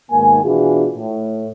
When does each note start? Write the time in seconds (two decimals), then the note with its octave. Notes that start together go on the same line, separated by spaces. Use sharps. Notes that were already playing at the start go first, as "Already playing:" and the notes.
0.11 G#2 B2 D#3 A#3 G#5
0.44 B2 E3 D4 F4 F#4 G#4
0.97 A2